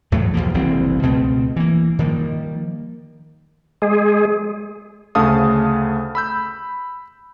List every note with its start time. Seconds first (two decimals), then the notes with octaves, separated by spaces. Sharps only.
0.12 E2 A2 F#3 A3
0.34 B1 E2 F3 A#3
0.54 F#1 C2 E3 C4
1.02 C#2 B2 A3 C4
1.56 E3 A#3
1.99 D#3 F3 G3 A#3
3.82 G#3 G#4
5.15 D2 C#3 A3 F5 A5 D#6
6.15 B5 E6 G6